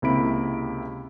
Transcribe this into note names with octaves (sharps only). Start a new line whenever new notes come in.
C#2 C3 A#3 E4 B5 D7